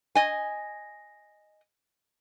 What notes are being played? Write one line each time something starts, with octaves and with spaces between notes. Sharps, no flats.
D#5 G#5